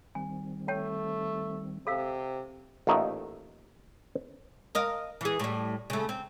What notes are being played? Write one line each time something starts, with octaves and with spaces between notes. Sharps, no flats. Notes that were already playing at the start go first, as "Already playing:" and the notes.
D#3 G3 C4 G#5
A3 C#5 G5 A5
C3 A4 F5 E6
A1 A#2 A3 D#4 F#5
A#4 D#5 F5
E3 G#4
A2 G3
C#3 A3
C4